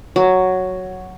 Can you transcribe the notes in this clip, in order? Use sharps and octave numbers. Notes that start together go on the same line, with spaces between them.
F#3